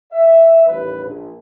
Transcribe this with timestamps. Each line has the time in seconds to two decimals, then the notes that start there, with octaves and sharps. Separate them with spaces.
0.12 E5
0.66 A1 D#2 A#2 G3 B4
1.04 A#1